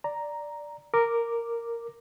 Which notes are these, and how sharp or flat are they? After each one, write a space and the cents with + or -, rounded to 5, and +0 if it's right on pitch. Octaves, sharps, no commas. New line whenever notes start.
D5 +0 A#5 +0
A#4 -5 D6 +0